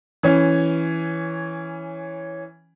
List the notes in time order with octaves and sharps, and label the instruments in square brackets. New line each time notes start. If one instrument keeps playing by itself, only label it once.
[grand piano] E3 C#4